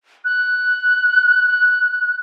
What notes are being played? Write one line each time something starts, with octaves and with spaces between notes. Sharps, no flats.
F#6